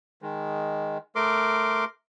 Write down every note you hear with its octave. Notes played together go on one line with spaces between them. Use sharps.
D#3 G#3
A3 A#4 C6 D6